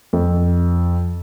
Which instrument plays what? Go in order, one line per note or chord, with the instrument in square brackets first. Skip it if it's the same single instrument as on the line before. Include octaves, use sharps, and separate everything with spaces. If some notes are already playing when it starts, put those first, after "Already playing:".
[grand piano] F2